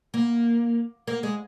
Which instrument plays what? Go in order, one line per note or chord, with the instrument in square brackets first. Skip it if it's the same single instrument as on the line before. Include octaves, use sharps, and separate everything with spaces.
[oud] A#3
A#3
G#3